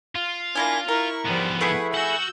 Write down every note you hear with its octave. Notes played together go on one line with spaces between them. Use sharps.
F4
A#3 D4 E4 G#5 A#6
E4 A#4 C#6
G#2 F3 G3 B3 C5
A3 E4 G#4 B4 F#5
F#4 F#5 E6 G6